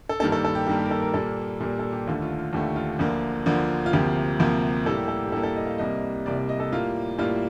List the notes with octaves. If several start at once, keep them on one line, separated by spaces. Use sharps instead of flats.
A4
G2 D#3 G3 A#3 A4
A4
A4
G4
G2 D#3 G3 A#3 G4
G4
A#4
A4
A#4
A#2 G3 A#3 A4
A#2 G3 A#3
A4
G4
D#2 D3 A3 F4
F4
F4
D#2 D3 A3 G4
F4
D2 D3 F3 A#3
D2 D3 F3 A#3
F4
D2 C3 F3 A#3 G4
D2 C3 F3 A#3
A2 G3 A#3 A4
G4
A4
G4
A2 G3 A#3 A4
A4
D#5
F5
C2 C3 G3 A#3 D#5
C2 C3 G3 A#3 D5
D5
D#5
A4
A2 G3 A#3 F4
A2 G3 A#3 F4